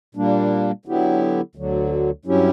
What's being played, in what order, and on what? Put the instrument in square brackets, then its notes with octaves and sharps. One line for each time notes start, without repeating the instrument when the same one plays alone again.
[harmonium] A#2 G3 A#3 D4
D3 F#3 B3 E4 G4
D2 D3 F#3
G2 F#3 C#4 E4 G4